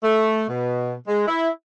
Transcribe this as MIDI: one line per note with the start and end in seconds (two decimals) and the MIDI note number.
0.03 0.44 57
0.49 0.93 47
1.07 1.27 56
1.27 1.49 64